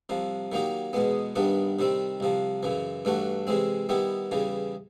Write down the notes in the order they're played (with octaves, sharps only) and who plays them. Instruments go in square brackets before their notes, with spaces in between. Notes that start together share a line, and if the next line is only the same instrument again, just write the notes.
[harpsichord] C2 C3 F3
D#3 F#3 A#3 D#4 G4
E2 B2 G#3 B3
G2 D#3 G3 B3 D4
C3 D#3 G3 C4
C2 C3 F3
F#2 C#3 E3
G2 E3 A3 D4 F#4
C3 E3 G#3 C4
D#3 G3 B3 E4 G4
E2 C#3 E3 G3